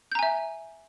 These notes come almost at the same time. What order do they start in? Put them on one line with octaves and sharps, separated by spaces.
G6 A#5 G#5 E5